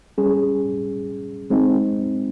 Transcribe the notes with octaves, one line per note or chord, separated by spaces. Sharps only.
G3 C#4 G#4
G#3 C4 D#4